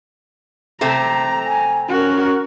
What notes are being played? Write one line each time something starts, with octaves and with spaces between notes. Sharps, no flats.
C3 A3 C4 A#5
G#5
C#4 F#4 A#4